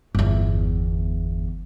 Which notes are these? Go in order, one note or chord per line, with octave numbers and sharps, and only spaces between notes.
G1 E2